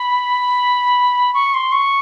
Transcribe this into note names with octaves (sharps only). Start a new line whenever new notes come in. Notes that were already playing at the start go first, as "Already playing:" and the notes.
Already playing: B5
C#6
C6
C#6